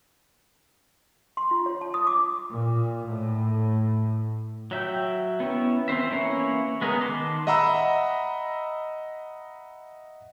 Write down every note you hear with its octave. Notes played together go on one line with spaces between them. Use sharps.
C6
F4
C#5
A5
D#6
D6
A#2
A2
F#3 E5 G5
B3 C#4 E4
E3 C4 C5 E5
E3 A#3 C#4 E4 C#5
G#3 B3 G#4 A#4
D#3 A5 C6 D6
D#5 E5 F#5 A#5 B5 E6